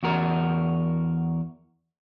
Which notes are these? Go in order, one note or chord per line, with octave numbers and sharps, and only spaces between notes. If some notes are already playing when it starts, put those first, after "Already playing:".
E2 F#4 A#4